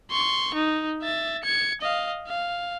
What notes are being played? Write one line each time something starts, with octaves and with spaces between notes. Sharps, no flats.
C6 C#6
D#4
E5 A6
G#6 C#7
D#5 F5
F5